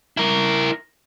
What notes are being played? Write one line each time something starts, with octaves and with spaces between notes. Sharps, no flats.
E4 A#4